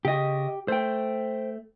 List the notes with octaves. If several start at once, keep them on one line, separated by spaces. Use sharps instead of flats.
C#3 G4 D#5
A3 C5 G5